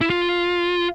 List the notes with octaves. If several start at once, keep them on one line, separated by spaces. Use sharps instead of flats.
E4
F4